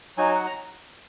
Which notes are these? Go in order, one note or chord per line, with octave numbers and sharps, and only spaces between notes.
F#3 D#4 F#4 G#5
F#5
A#5